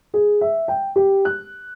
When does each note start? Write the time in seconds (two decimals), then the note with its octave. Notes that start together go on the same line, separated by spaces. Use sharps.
0.14 G#4
0.41 E5
0.68 G5
0.96 G4
1.25 F#6